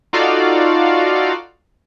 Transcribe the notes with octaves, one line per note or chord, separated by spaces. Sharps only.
D#4 F4 F#4 A4 D5 F5